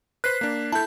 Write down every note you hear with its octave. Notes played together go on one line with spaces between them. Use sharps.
B4 C5 F#6 B6 C7
A#3 D4
E4 A4 A5 G6